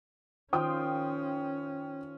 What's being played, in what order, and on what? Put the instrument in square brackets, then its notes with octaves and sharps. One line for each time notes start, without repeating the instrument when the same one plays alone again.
[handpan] D#3 F4 C5 [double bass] C#4 [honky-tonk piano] G5 D#6 F6